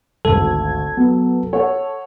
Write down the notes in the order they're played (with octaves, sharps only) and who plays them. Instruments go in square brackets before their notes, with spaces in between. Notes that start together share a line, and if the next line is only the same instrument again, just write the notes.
[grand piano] G#1 D2 [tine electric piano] A4 [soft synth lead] G#6
[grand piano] F#3 [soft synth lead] B3
[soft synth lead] A4 [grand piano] C#5 F#5